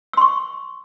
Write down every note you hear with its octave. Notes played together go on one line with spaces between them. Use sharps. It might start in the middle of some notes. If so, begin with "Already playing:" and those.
C6 C#6 E6